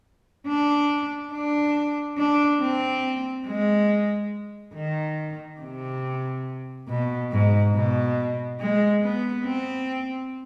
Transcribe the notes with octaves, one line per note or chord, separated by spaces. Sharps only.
D4
D4
D4
C4
G#3
D#3
C3
B2
G#2
B2
G#3
B3
C4